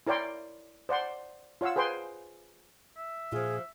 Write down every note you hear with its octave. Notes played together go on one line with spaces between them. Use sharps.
E4 A#4 C#5 D5 G5 C6
C5 D5 F#5 C6
F4 C#5 F5 F#5 E6
G#4 B4 C5 G5 C6
E5
A#2 F3 F4 G#4